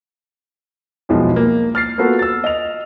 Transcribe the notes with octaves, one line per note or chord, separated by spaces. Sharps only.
B1 E2 B2 E3 F3 G#3
A#3
F6 A6 C7
A#3 B3 F4 F#4 A4 B4
E6 A6
D#5 F7